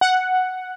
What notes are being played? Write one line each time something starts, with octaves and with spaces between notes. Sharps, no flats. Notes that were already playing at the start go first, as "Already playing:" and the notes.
F#5